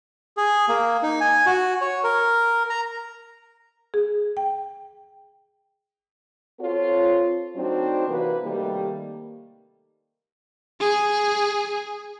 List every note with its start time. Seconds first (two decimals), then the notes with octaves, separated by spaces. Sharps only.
0.37 G#4
0.69 A#3
1.03 D#4
1.21 G#5
1.46 F#4
1.81 C#5
2.04 A#4
2.70 A#5
3.94 G#4
4.37 G5
6.60 C4 F4 A4 C#5
7.56 F#3 A3 C4 D4 D#4 F#4
8.09 C3 E3 A#3 F#4 B4
8.43 C3 D#3 G3 A3 A#3
10.80 G#4